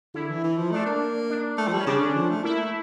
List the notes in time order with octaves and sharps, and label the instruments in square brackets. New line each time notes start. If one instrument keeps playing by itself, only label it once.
[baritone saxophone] D3 [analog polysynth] E4
[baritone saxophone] E3
E3
F3
[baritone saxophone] A3 [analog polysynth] D4
[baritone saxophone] A#3
[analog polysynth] D4
[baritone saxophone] A3
F3
G3
[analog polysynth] C#4
[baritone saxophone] C#3 [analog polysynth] D4
[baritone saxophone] D3
F3
A3
[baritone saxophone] A#3 [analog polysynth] E4
[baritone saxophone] A3